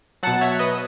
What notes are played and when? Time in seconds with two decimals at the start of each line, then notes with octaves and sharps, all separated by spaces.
0.23 B2 F#3 F#5 A5
0.41 C#5 E5
0.59 B4 D#5